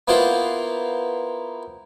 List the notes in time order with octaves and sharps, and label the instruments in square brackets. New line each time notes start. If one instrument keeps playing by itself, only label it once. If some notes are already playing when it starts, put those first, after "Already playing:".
[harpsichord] A#3 B3 E4 F4 C5